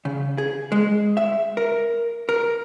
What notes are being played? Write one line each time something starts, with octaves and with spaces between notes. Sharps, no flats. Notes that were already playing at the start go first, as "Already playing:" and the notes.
C#3
G#4
G#3
E5
A#4
A#4